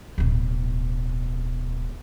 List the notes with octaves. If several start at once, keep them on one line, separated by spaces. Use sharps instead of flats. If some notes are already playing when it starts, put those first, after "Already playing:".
D1 B2